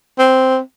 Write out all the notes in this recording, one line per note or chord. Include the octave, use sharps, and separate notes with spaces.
C4